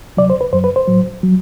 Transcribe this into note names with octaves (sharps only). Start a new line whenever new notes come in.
D2 C3 F#3 D5
C5
B4
F#2 F#3 C5
B4
C5
A2 F#3
F#3